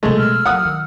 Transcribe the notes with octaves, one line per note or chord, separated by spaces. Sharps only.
A2 C3 G#3 A3
B2 G3 E6 F6
F#3 G#3 F#5 D#6
D#3